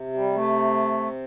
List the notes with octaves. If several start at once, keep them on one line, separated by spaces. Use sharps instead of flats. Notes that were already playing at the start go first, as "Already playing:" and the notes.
Already playing: C3
G3
A3